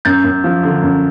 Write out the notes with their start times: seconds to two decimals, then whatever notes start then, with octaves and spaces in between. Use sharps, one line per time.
0.05 F#2 G6 A6
0.24 F#2
0.44 F3
0.63 D3
0.82 F#2